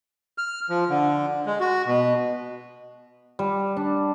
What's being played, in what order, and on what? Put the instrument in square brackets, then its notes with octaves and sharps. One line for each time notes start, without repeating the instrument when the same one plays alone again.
[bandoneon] F6
F3
D3
G#3
F#4
B2
[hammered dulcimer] G3
D4